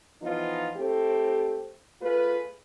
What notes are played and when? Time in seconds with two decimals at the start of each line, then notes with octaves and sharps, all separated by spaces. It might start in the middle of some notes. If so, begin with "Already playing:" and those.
0.23 E3 F3 B3 D#4 F4
0.77 A3 C4 E4 G4 A4
2.02 A3 F4 G#4 B4